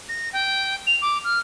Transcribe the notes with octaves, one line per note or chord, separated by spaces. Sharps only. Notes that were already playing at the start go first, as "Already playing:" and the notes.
A#6
G5
F7
D6
F6